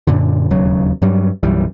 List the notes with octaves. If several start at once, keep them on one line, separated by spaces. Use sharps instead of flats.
F#2 A#2 D3
E1 D#2 C#3 F#3
G2 F#3 G3
B1 F#2 E3 G3